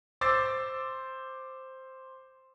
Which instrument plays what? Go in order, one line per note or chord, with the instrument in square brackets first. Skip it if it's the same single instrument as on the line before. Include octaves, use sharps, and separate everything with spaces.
[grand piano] C5 D6 E6 A6 C7